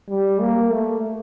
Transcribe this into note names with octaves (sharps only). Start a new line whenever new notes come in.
G3
A#3
A3